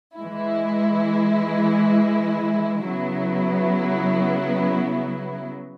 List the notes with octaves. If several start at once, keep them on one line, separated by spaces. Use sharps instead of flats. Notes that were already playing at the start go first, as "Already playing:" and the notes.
E3 G#3 E4
C#3 F#3 B3 E4